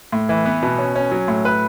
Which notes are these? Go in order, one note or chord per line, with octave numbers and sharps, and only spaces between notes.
A2
E3
B3
B2
C#4
C#4
F#3
A2
B4